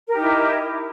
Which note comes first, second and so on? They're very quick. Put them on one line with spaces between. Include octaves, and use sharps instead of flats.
A#4 G4 D#4 E4